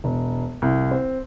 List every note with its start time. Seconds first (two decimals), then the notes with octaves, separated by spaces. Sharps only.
0.04 E1
0.62 C2
0.91 C4